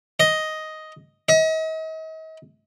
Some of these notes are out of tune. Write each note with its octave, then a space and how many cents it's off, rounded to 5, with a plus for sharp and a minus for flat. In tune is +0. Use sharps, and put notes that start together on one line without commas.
D#5 +5
D#5 +40